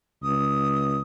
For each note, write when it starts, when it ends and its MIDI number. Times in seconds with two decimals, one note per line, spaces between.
0.23 1.02 37
0.23 1.01 87